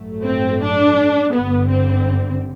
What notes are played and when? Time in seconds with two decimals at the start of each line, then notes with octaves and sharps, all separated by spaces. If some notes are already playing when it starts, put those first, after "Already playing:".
Already playing: A1 G2 F#3 A3
0.25 C4
0.62 D4
1.33 G1 G2 D3 B3
1.69 C4